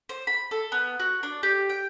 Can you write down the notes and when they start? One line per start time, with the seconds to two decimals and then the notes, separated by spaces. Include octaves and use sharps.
0.09 C5
0.27 B5
0.51 A4
0.72 B3
1.00 F#4
1.23 D4
1.43 G4
1.70 G5